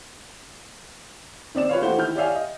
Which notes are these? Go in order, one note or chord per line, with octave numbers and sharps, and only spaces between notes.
D#3 C4 D5 E7
F4 B4 C#5 F5
E3 A3 F#4 G4 C5 G7
D#3 E4 F6 G6
G4 C#5 D5 E5 F5 G#5
D#5